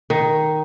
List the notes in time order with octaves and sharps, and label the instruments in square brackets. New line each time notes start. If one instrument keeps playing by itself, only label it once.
[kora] D#3